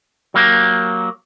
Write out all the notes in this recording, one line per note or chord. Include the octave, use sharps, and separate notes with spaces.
F#3 A#3 G4